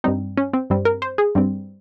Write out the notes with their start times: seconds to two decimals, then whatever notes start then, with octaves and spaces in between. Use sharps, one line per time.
0.04 G2 G3 C4 D#4
0.37 C#4
0.53 C4
0.70 G2 G3 C4
0.85 A#4
1.02 C5
1.18 G#4
1.35 G2 G3 C4